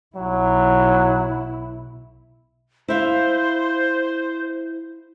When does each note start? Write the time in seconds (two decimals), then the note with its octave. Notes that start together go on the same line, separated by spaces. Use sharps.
0.16 B1 F#3 E4
2.88 E4 C5 E5 F5